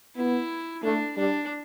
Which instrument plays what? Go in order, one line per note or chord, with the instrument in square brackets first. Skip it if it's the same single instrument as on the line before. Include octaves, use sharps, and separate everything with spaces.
[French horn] B3 [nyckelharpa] E4
[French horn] A3 [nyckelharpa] D4
[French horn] G3 [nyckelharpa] D4